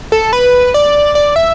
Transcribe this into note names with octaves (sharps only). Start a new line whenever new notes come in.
A4
B4
D5
D5
E5